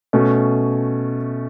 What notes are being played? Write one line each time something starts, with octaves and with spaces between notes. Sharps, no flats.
B2 A3 C#4